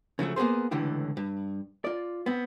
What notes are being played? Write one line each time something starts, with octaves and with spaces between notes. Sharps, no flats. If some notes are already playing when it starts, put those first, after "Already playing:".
C#3 F3 F#3 A3
A#3 B3 C#4 G#4 C5
C#2 A2 D3 E3 G4
G2
F4 D5
B3 C4